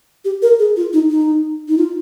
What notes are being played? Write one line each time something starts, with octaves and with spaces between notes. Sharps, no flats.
G4
A#4
G#4
F4
D#4
D#4
D#4
F4